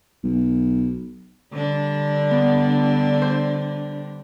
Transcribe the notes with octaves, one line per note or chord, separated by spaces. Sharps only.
B1
D3 G3 D4
B3
C5